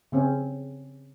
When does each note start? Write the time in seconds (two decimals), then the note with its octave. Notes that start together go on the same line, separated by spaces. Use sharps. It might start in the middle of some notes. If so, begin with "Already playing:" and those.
0.12 C#3 C4 C#4